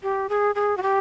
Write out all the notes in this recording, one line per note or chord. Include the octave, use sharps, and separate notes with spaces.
G4
G#4
G#4
F#4
G4